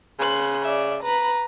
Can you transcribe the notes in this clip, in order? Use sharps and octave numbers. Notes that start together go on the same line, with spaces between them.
C#3 C6 F#6
D5 E5
B4 A#5 B5